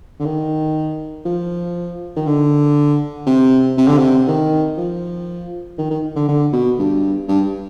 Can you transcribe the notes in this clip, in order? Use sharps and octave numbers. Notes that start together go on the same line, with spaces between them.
D3
D#3
F3
D#3
D3
C3
C3
D3
C3
D#3
F3
D#3
D#3
D3
D3
B2
G2
G2